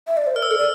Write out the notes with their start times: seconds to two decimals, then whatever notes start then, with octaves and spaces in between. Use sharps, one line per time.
0.07 E5
0.17 D5
0.27 C5
0.35 A#4 F6
0.42 E6
0.50 A4 F6
0.57 D5